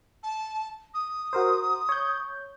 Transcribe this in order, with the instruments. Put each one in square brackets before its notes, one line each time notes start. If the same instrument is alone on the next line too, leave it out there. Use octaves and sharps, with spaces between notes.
[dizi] A5
D#6
[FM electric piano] F#4 A#4 C5
C#5 G6